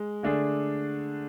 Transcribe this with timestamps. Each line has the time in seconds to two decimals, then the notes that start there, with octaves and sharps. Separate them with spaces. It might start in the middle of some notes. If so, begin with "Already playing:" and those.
Already playing: G#3
0.23 D3 A3 D4 G#4